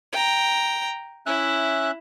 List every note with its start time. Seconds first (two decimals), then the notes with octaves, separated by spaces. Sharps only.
0.12 G5 A#5
1.26 C#4 E4 E5 F#6